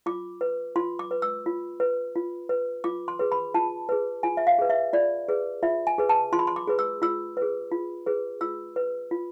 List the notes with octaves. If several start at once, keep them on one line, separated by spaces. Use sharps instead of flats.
F4 D6
B4
F4 C6
D6
B4
E6
F4
B4
F4
B4
F4 D6
C6
G#4 B4
B5
F4 A5
G#4 B4
F4 G#5
E5
F5
G#4 B4
E5
F4 D5
G#4 B4
F4 E5
G#5
G#4 B4
A5
F4 C6
B5
C6
D6
G#4 B4
E6
F4 E6
G#4 B4
F4
G#4 B4
F4 E6
B4
F4